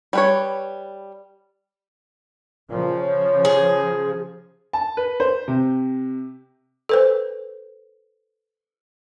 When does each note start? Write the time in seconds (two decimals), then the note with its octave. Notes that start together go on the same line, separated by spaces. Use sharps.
0.13 G3 B4 C#5
2.70 A#2 C#3 F3
2.99 C#5
3.45 G#4
4.73 A5
4.97 B4
5.20 C5
5.48 C3
6.89 A4 B4 C5